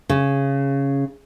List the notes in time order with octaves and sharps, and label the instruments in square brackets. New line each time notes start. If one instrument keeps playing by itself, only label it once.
[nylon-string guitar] C#3